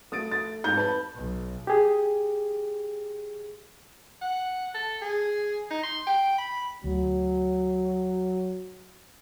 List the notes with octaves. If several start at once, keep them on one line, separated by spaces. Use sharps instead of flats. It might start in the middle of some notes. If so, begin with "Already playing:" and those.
A3 D#6 A6 D7
A6
F2 G#2 G6
B4 A5 B5
B1
G4 G#4
F#5
A4
G#4
D#4
C6
G5
B5
D2 F#3